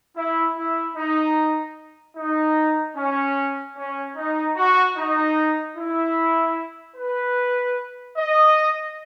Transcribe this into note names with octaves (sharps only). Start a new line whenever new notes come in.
E4
E4
D#4
D#4
C#4
C#4
D#4
F#4
D#4
E4
B4
D#5